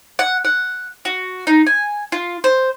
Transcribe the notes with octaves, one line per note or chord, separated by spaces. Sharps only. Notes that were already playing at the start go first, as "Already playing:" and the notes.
F#5
F#5
F#4
D#4
G#5
F4
C5